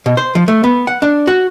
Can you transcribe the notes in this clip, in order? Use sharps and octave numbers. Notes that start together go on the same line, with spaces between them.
B2
C5
F3
A3
B3
F#5
D4
F#4